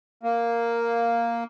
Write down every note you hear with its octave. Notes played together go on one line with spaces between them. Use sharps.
A#3